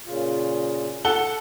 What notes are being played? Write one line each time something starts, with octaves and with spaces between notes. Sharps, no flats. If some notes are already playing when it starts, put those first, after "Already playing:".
A#2 C#3 F4
A4 F#5 G7